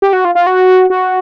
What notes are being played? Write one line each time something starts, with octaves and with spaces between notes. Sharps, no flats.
G4
F#4
F4
F4
F#4
F#4